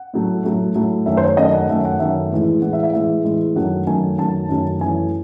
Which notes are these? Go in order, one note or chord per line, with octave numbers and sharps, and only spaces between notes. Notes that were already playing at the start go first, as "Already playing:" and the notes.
Already playing: F#5
A2 F#3 A3
A2 F#3 A3
A2 F#3 A3
F#2 D#3 A3 E5
C5
C#5
F#2 D#3 A3 D#5
F#5
F#2 D#3 A3 E5
F#5
F#2 D#3 A3 E5
A2 E3 G#3
A2 E3 G#3 F#5
E5
E5
A2 E3 G#3 E5
A2 E3 G#3
F#2 D#3 F#3 A3 F#5
F#2 D#3 F#3 A3 G#5
F#2 D#3 F#3 A3 A5
F#2 D#3 F#3 A3
F#2 E3 A3 G#5